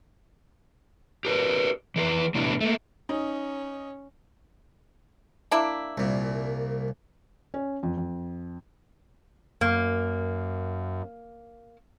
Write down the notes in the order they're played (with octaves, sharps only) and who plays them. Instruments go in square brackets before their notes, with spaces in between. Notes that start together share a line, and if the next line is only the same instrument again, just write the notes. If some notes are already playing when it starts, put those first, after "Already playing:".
[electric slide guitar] G4 A#4 B4
E3 G#4 B4
A2 C3 E3 G3 B3 D4
A3 A#3
[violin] C#4 [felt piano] D#4
[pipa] A#3 D4 E4
[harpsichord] C2 A#2
[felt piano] C#4
F2
F2
[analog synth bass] F#2 [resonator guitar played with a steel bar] A#3